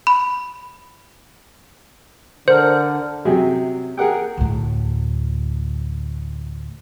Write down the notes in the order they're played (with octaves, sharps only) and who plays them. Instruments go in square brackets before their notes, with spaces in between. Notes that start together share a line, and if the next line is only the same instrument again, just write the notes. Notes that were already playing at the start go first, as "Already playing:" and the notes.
[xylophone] B5
[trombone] D3 [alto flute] A#4 [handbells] C5
[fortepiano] F#2 C3 F#3 G#4
G#4 A#4 F#5 G5
[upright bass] D2 A2